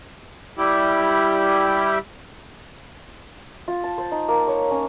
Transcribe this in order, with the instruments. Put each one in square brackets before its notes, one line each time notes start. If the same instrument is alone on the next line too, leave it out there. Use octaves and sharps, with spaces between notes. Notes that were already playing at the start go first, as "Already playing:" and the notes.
[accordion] G3 E4 G4
[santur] F4
A5
C5
D#4
A#3
C#5
C#4